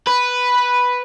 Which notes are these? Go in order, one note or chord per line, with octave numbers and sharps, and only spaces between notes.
B4